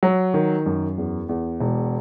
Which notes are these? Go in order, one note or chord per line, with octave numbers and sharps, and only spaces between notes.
F#3
D#3
F#2
E2
E2
E1